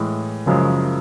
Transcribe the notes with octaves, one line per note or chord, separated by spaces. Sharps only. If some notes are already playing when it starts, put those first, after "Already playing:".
Already playing: A2 E3 G#3
F#1 F#2 C#3 F3 G#3